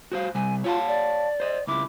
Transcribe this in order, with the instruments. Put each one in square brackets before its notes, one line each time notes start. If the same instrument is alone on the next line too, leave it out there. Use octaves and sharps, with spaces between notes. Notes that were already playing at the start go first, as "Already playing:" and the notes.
[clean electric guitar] F#4 C5 F5
[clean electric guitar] C3 G3 [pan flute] G#5
[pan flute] F4 [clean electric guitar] C#5 F5 A5
[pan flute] D5
[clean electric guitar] C5 D#5
[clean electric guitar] C#2 E4 [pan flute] D6